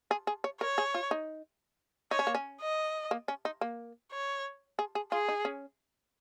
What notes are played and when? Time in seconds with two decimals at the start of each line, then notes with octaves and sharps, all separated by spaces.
0.11 G#4
0.27 G#4
0.44 C#5
0.61 A#4 C#5
0.78 G#4
0.94 F4
1.11 D#4
2.11 D#4 C#5
2.19 C#4
2.27 A#3
2.35 C#4
2.61 D#5
3.11 A#3
3.28 C#4
3.45 D#4
3.61 A#3
4.12 C#5
4.79 G#4
4.95 G#4
5.12 F4 G#4
5.28 D#4
5.45 C#4